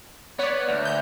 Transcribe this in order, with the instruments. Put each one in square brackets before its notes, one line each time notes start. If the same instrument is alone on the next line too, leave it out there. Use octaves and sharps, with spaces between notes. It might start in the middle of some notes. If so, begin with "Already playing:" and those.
[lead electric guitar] B3 [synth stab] C#5 D5
[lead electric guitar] D2
[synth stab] G6